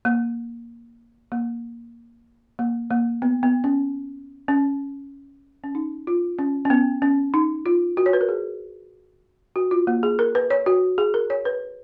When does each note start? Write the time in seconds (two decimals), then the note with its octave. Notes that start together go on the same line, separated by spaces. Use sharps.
0.05 A#3
1.32 A#3
2.59 A#3
2.90 A#3
3.22 B3
3.43 B3
3.64 C#4
4.48 C#4
5.64 C#4
5.75 D#4
6.07 F4
6.39 C#4
6.65 C#4
6.70 B3
7.02 C#4
7.34 D#4
7.66 F4
7.97 F#4
8.06 C#5
8.13 B4
8.21 A#4
8.29 G#4
9.56 F#4
9.71 F4
9.87 A#3
10.03 G#4
10.19 A#4
10.35 B4
10.50 C#5
10.66 F#4
10.98 G#4
11.14 A#4
11.30 C#5
11.45 B4